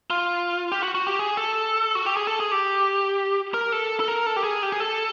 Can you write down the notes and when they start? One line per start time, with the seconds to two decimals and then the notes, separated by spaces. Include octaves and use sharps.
0.10 F4
0.72 G4
0.83 F#4
0.95 F#4
1.07 G4
1.19 G#4
1.37 A4
1.95 F#4
2.06 G4
2.17 G#4
2.27 A4
2.40 G#4
2.52 G4
3.54 A#4
3.72 A4
4.00 A4
4.08 A#4
4.26 A4
4.36 G4
4.44 G#4
4.63 G4
4.72 G#4
4.80 A4